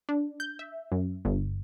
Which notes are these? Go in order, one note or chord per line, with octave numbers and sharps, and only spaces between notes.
D4
G6
E5
F#2
G1